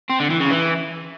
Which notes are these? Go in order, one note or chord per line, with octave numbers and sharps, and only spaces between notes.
C4
D3
E3
C#3
E3